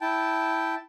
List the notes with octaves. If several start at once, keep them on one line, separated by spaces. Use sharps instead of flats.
E4 G5 A5